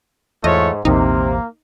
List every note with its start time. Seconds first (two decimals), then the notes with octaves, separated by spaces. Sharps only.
0.44 E2 G#2 A3 F4 C#5 D#5
0.85 A#1 E2 C3 A#3 C4 D#4